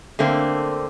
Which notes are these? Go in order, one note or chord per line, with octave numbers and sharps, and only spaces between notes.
D3 A3 A#3 C4